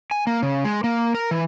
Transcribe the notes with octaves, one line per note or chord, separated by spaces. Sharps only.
G#5
A#3
C#3
G#3
A#3
A#4
E3